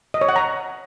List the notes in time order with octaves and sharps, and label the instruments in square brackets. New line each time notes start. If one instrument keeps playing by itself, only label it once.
[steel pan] D#5
C#5
F#5
A#5